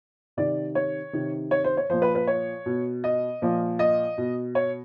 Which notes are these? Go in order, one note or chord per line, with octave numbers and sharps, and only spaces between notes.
C3 D#3 D5
C#5
C3 D#3
C#5
C5
C#5
A#2 F3 C5
B4
B4
C#5
B2
D#5
A#2 F3
D#5
B2
C#5